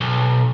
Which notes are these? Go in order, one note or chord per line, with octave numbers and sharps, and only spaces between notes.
B1